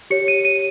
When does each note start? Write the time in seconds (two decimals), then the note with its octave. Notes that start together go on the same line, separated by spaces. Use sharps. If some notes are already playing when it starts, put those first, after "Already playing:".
0.10 G4 C#5 C#7
0.28 D#7
0.45 D#7